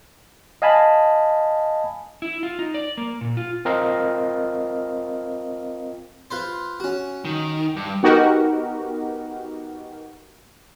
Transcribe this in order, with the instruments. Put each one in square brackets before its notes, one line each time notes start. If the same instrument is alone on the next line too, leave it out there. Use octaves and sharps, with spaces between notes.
[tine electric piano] D#5 F5 G#5 A5 B5
[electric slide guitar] E4
F4
D#4
D5
A#3
A#2
F4
[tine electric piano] C4 F4 A#4 D#5 F5
[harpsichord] F4 B4 C5
C#4 F#4
[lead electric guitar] D#3
G2
[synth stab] B3 D#4 F#4 G4 A#4